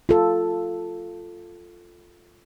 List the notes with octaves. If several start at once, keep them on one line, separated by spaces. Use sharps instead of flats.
F4 A4